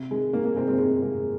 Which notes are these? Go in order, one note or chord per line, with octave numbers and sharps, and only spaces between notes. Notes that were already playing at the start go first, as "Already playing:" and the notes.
Already playing: C3
D#3 G#3
D#3 A#3
A#3
C3 G#3 C4
G#3 C4
D#3 G#3 C4
C3 A#3